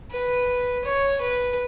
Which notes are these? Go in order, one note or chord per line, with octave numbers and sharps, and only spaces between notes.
B4
C#5
B4